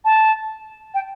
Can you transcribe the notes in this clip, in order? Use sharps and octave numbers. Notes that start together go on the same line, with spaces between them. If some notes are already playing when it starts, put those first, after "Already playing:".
A5
G5